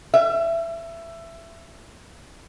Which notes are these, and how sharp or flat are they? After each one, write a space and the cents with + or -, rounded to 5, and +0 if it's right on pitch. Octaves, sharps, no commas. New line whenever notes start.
E5 +20